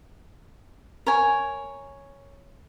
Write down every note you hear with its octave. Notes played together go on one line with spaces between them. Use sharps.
A#4 C#5 G#5